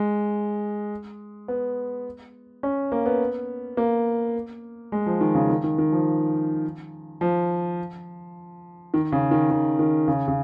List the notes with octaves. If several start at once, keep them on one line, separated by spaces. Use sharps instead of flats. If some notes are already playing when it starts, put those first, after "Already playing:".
Already playing: G#3
B3
C#4
A#3
B3
A#3
G#3
F3
D#3
C#3
D#3
D#3
D#3
F3
F3
D#3
C#3
D#3
D#3
D#3
C#3
C#3